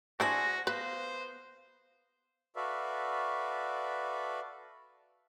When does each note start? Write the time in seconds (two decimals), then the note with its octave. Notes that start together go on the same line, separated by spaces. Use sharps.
0.20 D4 E4 F#4 G#4 C5 G#5 A#6
0.67 B3 B4 C5 F5
2.56 F#4 A4 B4 D5 E5 F5